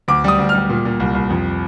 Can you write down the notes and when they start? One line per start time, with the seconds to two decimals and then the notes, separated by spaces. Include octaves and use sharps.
0.08 D2 D6
0.24 G3 D#6
0.38 D2
0.49 F6
0.54 G3
0.69 A#2
0.85 A#2
1.00 C2
1.15 C2
1.30 F2